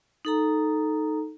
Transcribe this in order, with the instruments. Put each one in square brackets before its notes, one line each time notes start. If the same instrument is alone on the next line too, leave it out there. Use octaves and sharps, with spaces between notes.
[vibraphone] D#4 A4 A#5